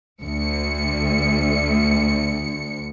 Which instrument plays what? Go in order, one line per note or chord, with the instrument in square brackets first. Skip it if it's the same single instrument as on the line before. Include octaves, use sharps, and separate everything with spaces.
[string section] D2 C#7